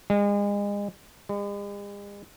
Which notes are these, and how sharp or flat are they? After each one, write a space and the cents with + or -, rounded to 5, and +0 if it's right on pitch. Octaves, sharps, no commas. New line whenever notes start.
G#3 -35
G#3 -45